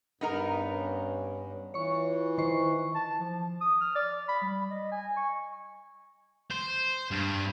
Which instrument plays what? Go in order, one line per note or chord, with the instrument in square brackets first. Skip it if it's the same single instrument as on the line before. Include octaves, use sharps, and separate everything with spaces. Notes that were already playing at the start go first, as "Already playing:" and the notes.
[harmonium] G2 [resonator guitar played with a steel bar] B3 D#4 A#4
[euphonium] C#4
[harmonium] E3 [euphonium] F4 [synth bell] C#5 C#6
[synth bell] D#3 C5 C#6
[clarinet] A5
F3
D#6
F6
D5
B5
G3
D#5
G#5
C#6
[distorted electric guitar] C5
G2